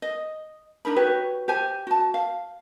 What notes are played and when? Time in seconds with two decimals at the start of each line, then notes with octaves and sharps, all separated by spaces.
0.02 D#5
0.85 D4 D#4 A#4 B5
0.96 F#4 G4 B4 C#5
1.48 G4 C5 G#5
1.87 F#4 A5
2.14 F5